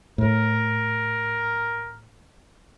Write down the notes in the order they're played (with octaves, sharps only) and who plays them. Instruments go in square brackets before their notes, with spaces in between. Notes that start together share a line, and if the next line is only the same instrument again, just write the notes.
[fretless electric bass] A2 [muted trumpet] A#4